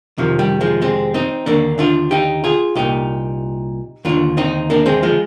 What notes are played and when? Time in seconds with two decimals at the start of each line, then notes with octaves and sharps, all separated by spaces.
0.18 F2 C3 D#3 F3
0.39 G3
0.61 F3 G#3
0.82 G#3 C4
1.14 C4 D#4
1.46 D#2 D3 A#3 D4
1.79 D4 F4
2.11 D#4 G4
2.44 F4 G#4
2.75 C2 A#2 D#4 G4
4.05 D#2 D3 D4 F4
4.37 C4 D#4
4.70 A#3 D4
4.86 G#3 C4
5.03 F3 G#3